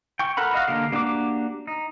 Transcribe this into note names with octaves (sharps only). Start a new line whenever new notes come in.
G5 C#6
A4 A#4 F#5 B5
F#4 D#5 F5 F#5
D3 A#3 G4 F5
A#3 D4 F#4 G4 D6
D#4